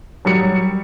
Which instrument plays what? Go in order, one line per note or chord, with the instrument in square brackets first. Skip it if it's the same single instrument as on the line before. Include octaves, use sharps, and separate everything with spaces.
[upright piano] F#3 G3 C#7